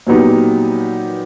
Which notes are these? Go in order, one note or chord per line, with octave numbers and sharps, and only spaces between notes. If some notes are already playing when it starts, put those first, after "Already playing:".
A#2 F#3 B3 D#4 G4